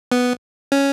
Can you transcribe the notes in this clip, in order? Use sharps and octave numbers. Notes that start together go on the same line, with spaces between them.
B3
C#4